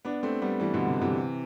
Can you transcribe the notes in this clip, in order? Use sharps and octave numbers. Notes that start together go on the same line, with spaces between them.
B3 D4
A3 C4
G3 B3
E3 G3
B2 D3
C3
C3 E3